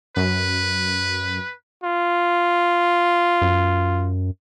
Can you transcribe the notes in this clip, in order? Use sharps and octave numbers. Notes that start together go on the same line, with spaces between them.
F#2 B4
F4
F#2